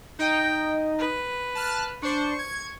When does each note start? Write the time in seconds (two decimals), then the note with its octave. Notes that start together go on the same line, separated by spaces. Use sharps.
0.19 D#4 D#5 G5
0.99 B4
1.55 A5 F6 F#6
2.02 D4 C5 C#6
2.39 G#6